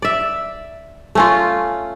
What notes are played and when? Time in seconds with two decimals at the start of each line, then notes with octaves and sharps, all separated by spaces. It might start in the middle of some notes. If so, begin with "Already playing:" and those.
0.02 D5 E5
1.15 A3 C#4 F4